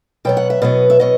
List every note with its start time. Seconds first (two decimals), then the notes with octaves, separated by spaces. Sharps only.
0.25 B2 F#3 B3 G5
0.37 F#5
0.50 E5
0.62 B2 F#3 B3 D#5
0.90 E5
0.99 B2 F#3 B3 D#5